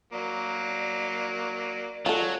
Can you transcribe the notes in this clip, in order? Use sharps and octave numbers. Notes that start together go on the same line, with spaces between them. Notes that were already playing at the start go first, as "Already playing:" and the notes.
F#3 A#3 D5
F#3 F4 A4